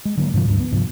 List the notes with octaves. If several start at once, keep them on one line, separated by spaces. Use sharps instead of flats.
G#3
D3 F#3 A#3
G2 C3 E3 F3
D2 G2 G#3
B3
G2 C3 F3